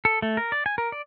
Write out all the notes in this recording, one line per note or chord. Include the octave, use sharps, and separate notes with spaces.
A4
A3
A#4
D5
G#5
A#4
D5